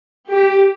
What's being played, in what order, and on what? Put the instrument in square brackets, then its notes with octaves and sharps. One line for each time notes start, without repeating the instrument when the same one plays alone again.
[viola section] G4